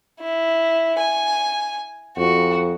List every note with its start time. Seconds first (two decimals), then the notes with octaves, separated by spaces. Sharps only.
0.20 E4
0.99 G#5
2.17 F2 F#4